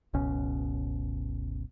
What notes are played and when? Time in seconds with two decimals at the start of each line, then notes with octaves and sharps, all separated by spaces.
0.14 F#1 C#2 B2 C#4